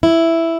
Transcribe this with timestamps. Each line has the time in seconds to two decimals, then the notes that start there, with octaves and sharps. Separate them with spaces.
0.03 E4